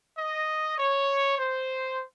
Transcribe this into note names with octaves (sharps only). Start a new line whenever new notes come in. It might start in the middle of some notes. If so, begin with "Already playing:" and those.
D#5
C#5
C5